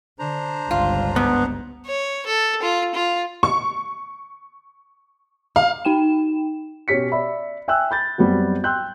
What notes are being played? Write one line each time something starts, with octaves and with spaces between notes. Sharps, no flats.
D3 D4 C5 A#5
G1 C#2 F4
G#2 B3
C#5
A4
F4
F4
C#6
F5
D#4 G5 E7
B2 C#4 G4 B6 C#7
D5 E5 B5
E5 G5 G#5 E6 F#6
B5 G6 A6
F#2 G3 B3 C4 F#4
G5 C6 E6 F#6 G6